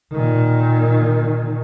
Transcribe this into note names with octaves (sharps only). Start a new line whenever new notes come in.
A#2 D#3